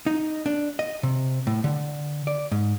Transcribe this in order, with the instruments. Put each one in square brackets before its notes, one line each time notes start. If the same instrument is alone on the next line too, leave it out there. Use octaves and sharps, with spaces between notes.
[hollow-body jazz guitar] D#4
D4
D#5
C3
A2
D3
D5
G#2